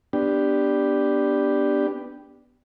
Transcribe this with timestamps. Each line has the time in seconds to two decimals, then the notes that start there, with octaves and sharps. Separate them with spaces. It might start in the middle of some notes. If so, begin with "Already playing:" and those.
0.13 B3 D4 G4